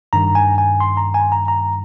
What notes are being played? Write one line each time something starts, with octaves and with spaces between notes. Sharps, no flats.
G2 D#3 A#5
G#5
G#5
C6
A#5
G#5
A#5
A#5